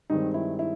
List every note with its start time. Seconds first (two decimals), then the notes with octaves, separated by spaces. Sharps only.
0.10 G2 D#3 G#3 C4 D#4
0.34 E4
0.59 E4